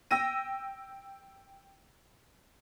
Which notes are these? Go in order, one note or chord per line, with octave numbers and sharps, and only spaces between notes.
G5 E6 A#6 D#7